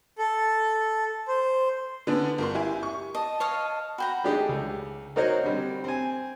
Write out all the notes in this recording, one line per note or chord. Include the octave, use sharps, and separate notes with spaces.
A4
C5
D3 B3 C#4 D4
G1 A#4 C6
E4 G4 G#5
C#6
D#5 A5
C#5 D#5 F5
F#4 G5 A#5 B5
A3 D4 D#4 G4 G#4
C#2
D#4 F#4 A#4 C5 C#5 D#5
D3 G3 C4
C4 G#5